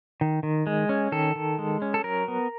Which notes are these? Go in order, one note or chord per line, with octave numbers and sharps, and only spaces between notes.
D#3
D#3
G#3
C#4
D#3 A4
D#3
G#3
C#4
A4
F#3 A#4
B3